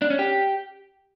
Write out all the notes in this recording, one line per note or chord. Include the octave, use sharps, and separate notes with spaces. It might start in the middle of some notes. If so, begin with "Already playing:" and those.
D4
C#4
G4